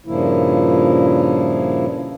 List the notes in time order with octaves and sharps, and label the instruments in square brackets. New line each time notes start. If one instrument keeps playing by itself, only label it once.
[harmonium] G2 A#2 C#3 F3 A#3 E4